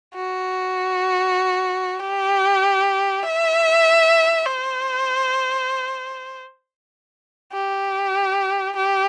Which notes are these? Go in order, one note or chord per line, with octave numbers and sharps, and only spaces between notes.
F#4
G4
E5
C5
G4
G4